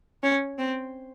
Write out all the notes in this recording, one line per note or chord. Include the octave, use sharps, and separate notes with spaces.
C#4
C4